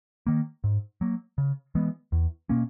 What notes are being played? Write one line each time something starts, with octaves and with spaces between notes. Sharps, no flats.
D#3 A#3
G#2
F#3 A#3
C#3
E3 G#3 B3
E2
B2 A#3 C#4